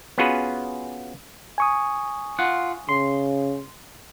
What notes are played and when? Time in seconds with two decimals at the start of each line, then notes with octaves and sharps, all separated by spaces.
0.18 B3 C#4 F4 F#4 G#4 B4
1.58 G#5 C#6 D#6
2.39 F4 F#5
2.89 C#3 C6